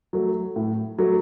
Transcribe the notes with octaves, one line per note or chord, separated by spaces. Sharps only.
F#3 A3
A2
F#3 A3